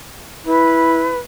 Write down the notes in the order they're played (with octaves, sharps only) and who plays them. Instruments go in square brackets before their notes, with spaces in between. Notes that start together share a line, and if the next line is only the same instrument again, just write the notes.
[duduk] E4 [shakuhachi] B4